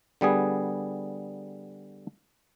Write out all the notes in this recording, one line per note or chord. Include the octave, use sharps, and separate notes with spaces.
D3 G3 B3 G#4